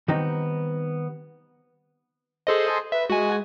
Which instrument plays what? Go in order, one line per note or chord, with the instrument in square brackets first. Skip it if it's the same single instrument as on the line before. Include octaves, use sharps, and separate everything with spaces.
[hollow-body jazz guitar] D#3 G3 B3 C4 D#4
[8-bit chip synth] G#4 A4 D#5 [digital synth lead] C5
[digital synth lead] B4 [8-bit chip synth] E5
[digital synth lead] G#3 [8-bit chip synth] F#4 G#5